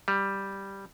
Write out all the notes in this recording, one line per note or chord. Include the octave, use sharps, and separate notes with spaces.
G3